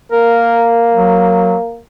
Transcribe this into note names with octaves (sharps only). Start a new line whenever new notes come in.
A#3 A#4
F#3